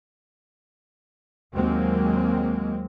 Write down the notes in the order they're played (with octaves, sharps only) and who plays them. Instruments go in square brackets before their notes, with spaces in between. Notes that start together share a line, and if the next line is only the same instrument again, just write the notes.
[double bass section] D#2 F#3 G#3 A#3 C4